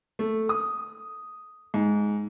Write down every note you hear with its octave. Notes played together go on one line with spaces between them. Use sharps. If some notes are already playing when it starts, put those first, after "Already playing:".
A3
D#6
G#2